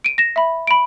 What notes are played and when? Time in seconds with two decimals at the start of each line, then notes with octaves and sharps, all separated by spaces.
0.04 D7 D#7
0.18 A#6 E7
0.36 E5 B5
0.67 B5 D7